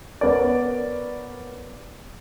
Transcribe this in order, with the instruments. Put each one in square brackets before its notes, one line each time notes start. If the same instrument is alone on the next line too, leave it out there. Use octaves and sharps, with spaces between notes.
[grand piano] B3 A#4 B4 C#5 D5